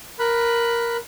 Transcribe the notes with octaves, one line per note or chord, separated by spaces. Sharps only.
A#4 B5 F#6